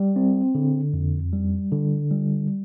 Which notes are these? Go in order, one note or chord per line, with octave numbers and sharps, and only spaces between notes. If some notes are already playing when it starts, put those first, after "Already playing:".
Already playing: G3
C4
D3
F2
G3
D3
G3